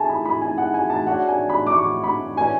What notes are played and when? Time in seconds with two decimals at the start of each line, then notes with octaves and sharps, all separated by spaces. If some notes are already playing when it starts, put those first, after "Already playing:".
Already playing: A3 E4 G#4 G#5 A5
0.09 B5
0.25 B5
0.41 G#5
0.58 F#5
0.74 G#5
0.90 A5
1.07 D4 F#4 C#5 F#5
1.28 G#5
1.49 B5
1.67 D6
1.72 C#6
2.04 B5
2.37 C#4 E4 B4 D5 G#5